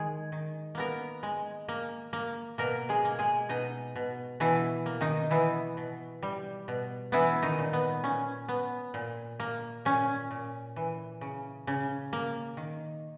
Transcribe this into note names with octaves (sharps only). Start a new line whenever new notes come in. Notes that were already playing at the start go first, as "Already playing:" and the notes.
Already playing: D#3 G#3 G#4
D#3
A#3 B3 A#4
G#3
A#3
A#3
B2 A#3 A#4
G#3 G#4
A#3
G#3 G#4
B2 D#4 D#5
B2
B2 E3 E4
A#3
D#3 D#4
E3 B3 E4
B2
G3
B2
E3 B3 E4
D#3 D#4
A#2
B3
A#2 C#4
B3
A#2
A#3
A#2 C#4
A#2
E3
C#3
C#3
A#3
D#3